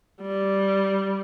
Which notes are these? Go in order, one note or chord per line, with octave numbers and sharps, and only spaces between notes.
G3